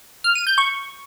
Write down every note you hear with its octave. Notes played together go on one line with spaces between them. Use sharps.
F6
D#7
G6
C#6